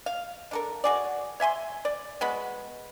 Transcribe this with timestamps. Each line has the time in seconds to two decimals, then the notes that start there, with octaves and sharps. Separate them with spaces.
0.06 F5
0.51 D4 A4 A#4
0.84 F#4 G#4 D5
1.40 C#5 E5 G#5 C6
1.85 D5
2.21 G#3 B3 F#4 B5